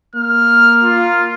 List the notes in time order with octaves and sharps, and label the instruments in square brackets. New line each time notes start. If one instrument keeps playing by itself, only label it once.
[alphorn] A#3 [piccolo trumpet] F6
[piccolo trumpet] F4